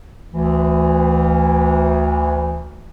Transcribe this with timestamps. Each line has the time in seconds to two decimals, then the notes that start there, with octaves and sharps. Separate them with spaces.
0.33 D2 E3